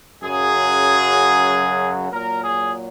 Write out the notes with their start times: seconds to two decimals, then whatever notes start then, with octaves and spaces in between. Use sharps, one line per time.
0.22 F#2 C#3 F#3 G#4
2.11 A#2 F#3 A#4
2.42 G#4